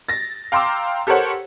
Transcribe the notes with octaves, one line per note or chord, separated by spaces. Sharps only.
A6 A#6
F5 G5 A#5 C6 D6 E6
G4 A4 A#4 C5 C#5 F#5